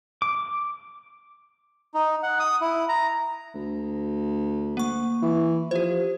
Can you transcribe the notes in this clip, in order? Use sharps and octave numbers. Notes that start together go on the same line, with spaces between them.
D6
D#4
F#5
D#6
E4
A#5
D2
A#3 C#6
E3
F3 G4 C5